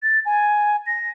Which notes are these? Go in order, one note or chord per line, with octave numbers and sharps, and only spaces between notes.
A6
G#5
A#6